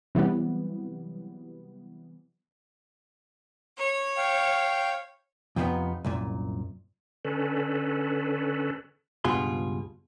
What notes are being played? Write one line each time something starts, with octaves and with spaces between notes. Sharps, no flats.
C3 E3 F#3 G3 B3
C#5
F5 G5
F2 C3 F3 G#3 B3 D#4
C2 F#2 A#2
D3 C#4 A4 B4
C#2 G2 B2 F4 G#4 C6